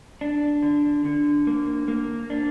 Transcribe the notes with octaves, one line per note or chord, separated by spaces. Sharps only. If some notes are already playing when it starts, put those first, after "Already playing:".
D4
D3
D3
A#3
A#3
D4